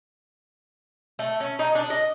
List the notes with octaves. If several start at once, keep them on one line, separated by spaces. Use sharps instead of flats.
A3
C#4
D#4
D4
D#5